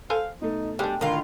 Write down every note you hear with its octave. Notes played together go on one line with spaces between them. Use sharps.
A4 C5 F5 G#5
B2 A3 D#4
G3 G#3 D4 G4
A2 D3 D#3 F4 A#4